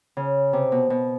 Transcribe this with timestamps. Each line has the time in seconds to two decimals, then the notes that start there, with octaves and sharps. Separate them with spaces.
0.17 C#3
0.53 C3
0.72 B2
0.90 B2